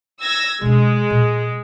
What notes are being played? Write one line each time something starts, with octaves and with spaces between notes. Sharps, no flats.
E6 G#6 A#6
B2 G#3 D4
A#2